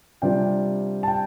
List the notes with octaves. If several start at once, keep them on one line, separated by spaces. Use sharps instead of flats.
C3 G3 D4 F4 G5
A5
G5